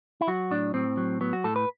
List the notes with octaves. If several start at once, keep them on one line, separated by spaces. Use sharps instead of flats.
E4
F#3 F#4
A2 D4
A2 C4
F#3
F#3 B3
F#4
A2 A4
B4